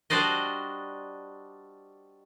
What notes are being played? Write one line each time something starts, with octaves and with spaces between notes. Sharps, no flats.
G3 D4 F#4 C5 D5 D#5